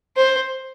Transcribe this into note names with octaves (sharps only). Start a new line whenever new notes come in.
C5